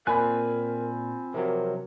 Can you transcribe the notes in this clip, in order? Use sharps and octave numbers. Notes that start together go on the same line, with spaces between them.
A#2 C4 F4 A#4 G#5 B5 F#6
C3 F3 F#3 A#4